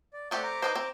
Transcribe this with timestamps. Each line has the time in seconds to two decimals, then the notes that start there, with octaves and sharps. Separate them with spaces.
0.13 D5
0.31 A3 C4 G4 D5 F#5
0.43 A#5 D6
0.62 D#4 B4 C5
0.75 C4